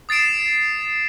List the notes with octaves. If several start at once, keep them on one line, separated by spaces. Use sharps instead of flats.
D#6 A6 C7 D7 E7